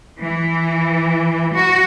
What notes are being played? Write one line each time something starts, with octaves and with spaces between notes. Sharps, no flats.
E3
F#4